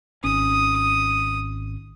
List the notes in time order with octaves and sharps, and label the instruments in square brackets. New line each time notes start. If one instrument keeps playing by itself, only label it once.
[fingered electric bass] G#1 C#4 [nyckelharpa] D#6